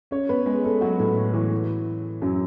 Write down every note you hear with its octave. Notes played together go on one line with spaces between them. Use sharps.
C#4 C#5
B3 B4
G#3 G#4
A3 A4
F#3 F#4
A2 A3
E3
F#2 F#3